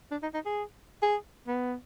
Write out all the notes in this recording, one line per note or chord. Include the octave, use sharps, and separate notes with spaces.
D4
D#4
D#4
G#4
G#4
B3